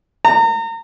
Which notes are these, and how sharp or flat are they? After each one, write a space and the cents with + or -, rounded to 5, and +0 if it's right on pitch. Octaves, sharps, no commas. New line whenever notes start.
A#5 -35